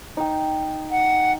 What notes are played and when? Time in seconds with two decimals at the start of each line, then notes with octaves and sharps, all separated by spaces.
0.17 D#4 G5
0.91 F#5